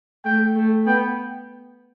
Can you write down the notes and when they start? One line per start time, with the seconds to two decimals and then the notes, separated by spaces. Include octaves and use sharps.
0.25 A3 G5
0.55 A3
0.86 B3 G5